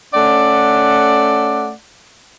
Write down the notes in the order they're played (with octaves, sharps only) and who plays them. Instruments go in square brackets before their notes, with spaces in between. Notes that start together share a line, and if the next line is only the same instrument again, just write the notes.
[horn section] A3 C#4 D5 F#5